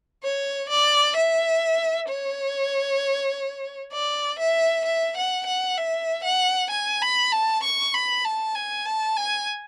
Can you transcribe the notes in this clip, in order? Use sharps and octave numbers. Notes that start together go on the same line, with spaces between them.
C#5
D5
E5
C#5
D5
E5
E5
F#5
F#5
E5
F#5
G#5
B5
A5
C#6
B5
A5
G#5
A5
G#5